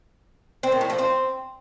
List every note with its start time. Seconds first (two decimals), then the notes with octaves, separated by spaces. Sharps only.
0.63 C4
0.72 D#3
0.81 A2
0.90 F3
0.99 C4